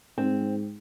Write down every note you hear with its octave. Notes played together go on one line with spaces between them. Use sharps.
G#2 C4